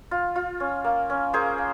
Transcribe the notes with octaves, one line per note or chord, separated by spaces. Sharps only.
F4
F4
C#4
A#3
C#4
A#3 G#4 C5
A#3